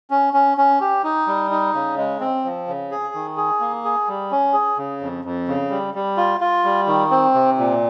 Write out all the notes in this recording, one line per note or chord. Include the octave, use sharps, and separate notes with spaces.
C#4
C#4
C#4
G4
D#4
G3
D#4
C#3
G#3
C4
F3
C#3
G#4
D#3
G#4
A#3
G#4
G3
C#4
G#4
C#3
F2
F2
C#3
G3
G3
F4
F4
G3
D#3
C4
C3
A#2